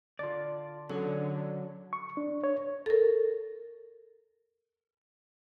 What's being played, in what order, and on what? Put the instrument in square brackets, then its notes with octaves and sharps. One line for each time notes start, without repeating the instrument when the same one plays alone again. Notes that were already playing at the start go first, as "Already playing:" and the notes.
[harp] D3 [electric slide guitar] F4 D5
[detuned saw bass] D3 [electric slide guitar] F#3 [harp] C#4 G#4 C#5 [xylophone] A4
[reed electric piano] C#6
D4
C#5
[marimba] A4 A#4